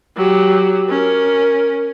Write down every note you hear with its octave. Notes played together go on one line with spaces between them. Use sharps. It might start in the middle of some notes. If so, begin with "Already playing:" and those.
F#3 G4
C#4 A#4